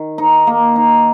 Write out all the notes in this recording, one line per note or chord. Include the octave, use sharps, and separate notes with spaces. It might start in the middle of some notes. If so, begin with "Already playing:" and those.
Already playing: D#3
D#4
A#3
D#4